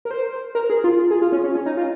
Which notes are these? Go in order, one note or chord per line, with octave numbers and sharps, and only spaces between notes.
A#4
C5
A#4
G#4
F4
G#4
F4
C#4
C#4
C#4
D#4
F4